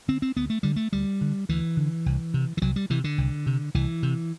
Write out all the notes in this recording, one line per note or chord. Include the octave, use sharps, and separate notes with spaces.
D3 C4
C4
D2 B3
A3
D3 G3
A3
D2 G3
D3
D2 E3
D3
C2
C3
E3
C2 F#3
G3
C3 E3
D3
C2
C3
C2 E3
C3